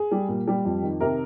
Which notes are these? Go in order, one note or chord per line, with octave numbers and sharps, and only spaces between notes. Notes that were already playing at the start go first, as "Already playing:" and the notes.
Already playing: G#4
G3
A#2
G3
F2
D#3
C3 A#4